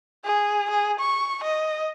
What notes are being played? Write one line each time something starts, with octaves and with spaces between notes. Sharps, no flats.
G#4
G#4
C#6
D#5